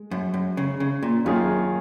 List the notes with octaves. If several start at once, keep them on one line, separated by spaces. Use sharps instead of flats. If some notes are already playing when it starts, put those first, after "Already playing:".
Already playing: G#3
F#2
F#2
C#3
C#3
A#2
F#2 D#3 A#3 C#4 F4 G#4